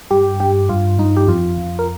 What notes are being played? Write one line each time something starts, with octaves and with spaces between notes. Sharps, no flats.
G2 G4
G2 G4
G2 F4
G2 D#4
G4
F2 F4
F2
A#4